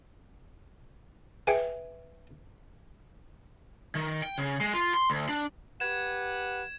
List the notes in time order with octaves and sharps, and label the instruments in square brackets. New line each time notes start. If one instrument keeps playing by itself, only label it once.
[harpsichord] G#4 G5 G#5 [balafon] B4 E5
[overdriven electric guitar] D#3
G5
C#3
G#3
F4
C6
D2
D4
[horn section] G4 B4 F#5 [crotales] G#6 E7